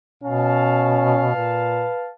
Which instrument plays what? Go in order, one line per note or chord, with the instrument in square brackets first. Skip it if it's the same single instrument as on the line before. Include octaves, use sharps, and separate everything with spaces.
[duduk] B2 [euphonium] C#4 [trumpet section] F5 A5
[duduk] A#2 [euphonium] B4